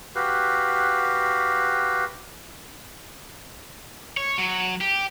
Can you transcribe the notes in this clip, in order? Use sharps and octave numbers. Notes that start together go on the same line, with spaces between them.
F#4 G4 B4 F5
C#5
F#3
G4